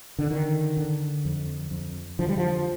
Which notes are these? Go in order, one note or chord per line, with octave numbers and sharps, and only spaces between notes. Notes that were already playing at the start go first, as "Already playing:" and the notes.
D3
D3 D#3
D3
F2
F2
D3 F3
G3
F3